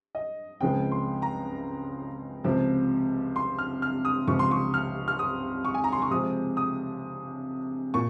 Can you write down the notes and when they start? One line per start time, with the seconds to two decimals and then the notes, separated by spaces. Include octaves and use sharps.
0.15 D#5
0.61 C#2 C#3 F3 G#3 C4 G5
0.91 C6
1.22 A#5
2.44 C#2 C3 F3 C4
3.36 C6
3.59 F6
3.82 F6
4.05 D#6
4.28 C#2 C3 F3 C#6
4.39 C6
4.51 C#6
4.74 F6
5.08 F6
5.19 D#6
5.65 C#6
5.74 G#5
5.84 A#5
5.92 C6
6.02 C#6
6.11 C3 F3 G#3 C4 D#6
6.57 D#6
7.94 A#2 C#6